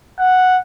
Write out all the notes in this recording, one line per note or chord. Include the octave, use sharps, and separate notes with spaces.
F#5